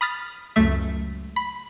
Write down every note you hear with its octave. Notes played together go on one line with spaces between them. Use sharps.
B5 D#6 F6 A6 B6
C#2 F#2 A3 E5
B5